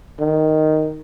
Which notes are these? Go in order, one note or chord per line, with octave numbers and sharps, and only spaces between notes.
D#3